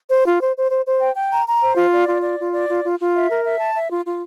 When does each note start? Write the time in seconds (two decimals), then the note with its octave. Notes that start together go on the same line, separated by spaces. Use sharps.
0.10 C5
0.25 F4
0.40 C5
0.56 C5
0.70 C5
0.86 C5
1.00 G5
1.16 G5
1.31 A#5
1.47 A#5
1.62 C5
1.77 F4
1.92 D5
2.07 F4
2.22 D5
2.39 F4
2.53 D5
2.69 F4
2.84 F4
3.00 F4
3.15 E5
3.29 A#4
3.45 E5
3.59 A5
3.75 E5
3.90 F4
4.05 F4